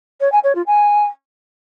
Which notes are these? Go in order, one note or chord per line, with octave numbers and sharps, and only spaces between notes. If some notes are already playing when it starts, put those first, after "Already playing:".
C#5
G#5
C#5
F4
G#5